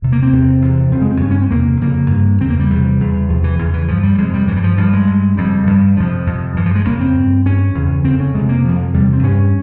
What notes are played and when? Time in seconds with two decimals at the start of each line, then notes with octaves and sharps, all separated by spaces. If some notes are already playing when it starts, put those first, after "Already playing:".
0.02 E2 C3
0.12 A#3
0.22 C4
0.33 E2 C3
0.62 E2 C3
0.91 F2 C#3 C4
1.02 G#3
1.11 C4
1.21 G2 C#4
1.31 C#4
1.42 C4
1.51 E2 C3 A#3
1.81 F2 C#3 A#3
2.10 G2
2.40 E2 C#3 C4
2.50 A#3
2.60 G3
2.70 E2 C3
3.00 E2 C#3
3.29 E2 C3 F3
3.44 E3
3.59 E2 C#3 E3
3.74 E3
3.88 G2 F3
4.03 G3
4.15 G3
4.18 F2 C3 G#3
4.34 G3
4.48 G2 E3
4.57 G3
4.64 F3
4.77 G2 F3
4.93 G#3
5.07 G2
5.37 F2 C#3 G3
5.67 G2
5.96 F2 C3 F3
6.27 F2 C3
6.56 G2 E3
6.66 F3
6.75 G#3
6.86 F2 C#3 A#3
7.00 C4
7.16 G2
7.46 G2 C#4
7.74 E2 C#3
8.04 F2 C#3 C4
8.20 C#4
8.34 F2 C3 G#3
8.49 A#3
8.64 F2 C3 F3
8.94 E2 C3 G3
9.13 C4
9.23 G2 C#4